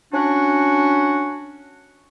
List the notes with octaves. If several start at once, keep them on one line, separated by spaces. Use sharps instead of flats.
C#4 D4 F#4